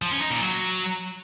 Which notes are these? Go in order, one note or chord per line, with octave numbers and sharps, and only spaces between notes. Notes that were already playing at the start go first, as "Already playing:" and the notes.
F3
C#4
D#4
A#2
F#3